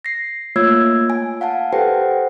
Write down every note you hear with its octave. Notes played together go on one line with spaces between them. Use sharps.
A#6 C7
A3 A#3 F4 C#5 E6 G#6
G#5
F5 F#5 G#5 A5
G4 A4 B4 C5 F#5 G5